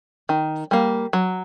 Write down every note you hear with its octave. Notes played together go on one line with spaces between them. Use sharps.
D#3
G3 A#3
F#3